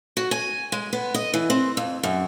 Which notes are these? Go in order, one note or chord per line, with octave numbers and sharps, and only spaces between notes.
F#4
G#5
G#3
B3
D#5
E3
C4
F2
F#2